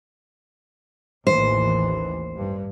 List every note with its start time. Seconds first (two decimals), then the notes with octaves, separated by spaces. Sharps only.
1.27 A1 D#2 E3 C5
2.36 G2